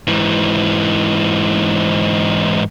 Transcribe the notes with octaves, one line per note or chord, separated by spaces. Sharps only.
G#2 E3